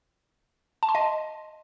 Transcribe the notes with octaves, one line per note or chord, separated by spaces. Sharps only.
A5
C6
D#5